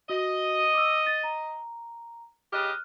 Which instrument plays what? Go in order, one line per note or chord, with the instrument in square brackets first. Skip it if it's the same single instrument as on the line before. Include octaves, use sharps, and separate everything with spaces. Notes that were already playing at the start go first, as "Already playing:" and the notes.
[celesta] F#4 [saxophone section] D#5
[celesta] D6 E6
A6
A#5
[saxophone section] C#3 G4 D#5 [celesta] F6 F#6